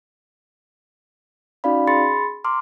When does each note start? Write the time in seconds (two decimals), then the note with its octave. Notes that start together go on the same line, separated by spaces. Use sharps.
1.64 C#4 D#4 F#4 D5 F5 B5
1.88 G#4 B5 C6 A6 C#7
2.44 A#5 C6 D6 F6